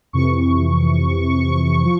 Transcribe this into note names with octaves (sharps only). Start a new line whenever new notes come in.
F2 C3 E3 C#6
F3